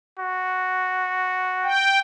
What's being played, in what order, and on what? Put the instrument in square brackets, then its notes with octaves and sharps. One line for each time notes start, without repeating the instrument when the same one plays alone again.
[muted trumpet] F#4
[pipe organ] G5